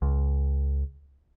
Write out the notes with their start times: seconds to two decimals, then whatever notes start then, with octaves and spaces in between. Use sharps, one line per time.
0.02 C#2